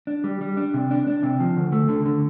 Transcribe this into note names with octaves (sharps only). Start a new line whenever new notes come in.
D4
G3
G3
D4
C3
D4
D4
C3
F3
D2
A3
D3
D3